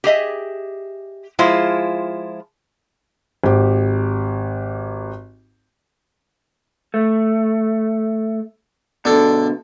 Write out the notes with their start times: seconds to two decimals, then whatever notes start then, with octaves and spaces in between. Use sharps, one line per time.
0.04 G4 G#4 D#5 E5
1.39 F3 G#3 E4 F4 C5
3.44 G#1 G4
6.94 A3
9.05 B2 D3 D4 A4